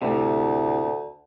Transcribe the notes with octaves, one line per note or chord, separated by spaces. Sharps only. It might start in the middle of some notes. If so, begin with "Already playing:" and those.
D2 A2 C3